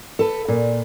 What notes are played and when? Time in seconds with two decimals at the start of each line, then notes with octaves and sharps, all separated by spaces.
0.19 A4 B4
0.48 A#2